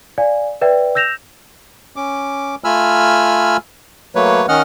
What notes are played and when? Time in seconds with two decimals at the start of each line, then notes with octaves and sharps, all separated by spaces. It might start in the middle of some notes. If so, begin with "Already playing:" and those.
0.18 D5 F5 G#5
0.61 B4 D5 E5 G5
0.95 E6 G6 A#6 E7 F7
1.96 C#4 D6
2.64 A3 F4 G#5 B5 E6 F6
4.15 F#3 A3 A#3 B4 C#5
4.49 D#3 C#4 D#5 F#5 F6